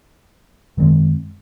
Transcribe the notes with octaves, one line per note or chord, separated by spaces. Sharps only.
F#2 D#3 G#3 C4